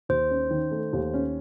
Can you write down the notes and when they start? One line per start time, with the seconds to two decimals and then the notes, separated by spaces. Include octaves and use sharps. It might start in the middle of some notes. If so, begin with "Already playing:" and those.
0.09 D#2 C5
0.31 C#4
0.51 D#3
0.71 A3
0.93 D#2
1.14 C#4